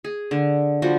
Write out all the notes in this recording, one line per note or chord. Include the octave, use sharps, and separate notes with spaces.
G#4
D3
F3 G3 F#4